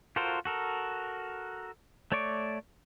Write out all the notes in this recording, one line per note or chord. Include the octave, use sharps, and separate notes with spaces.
F4 F#4 A4 A#4 C5
F#4 A4 A#4
A3 C#5 D5 C#6 D6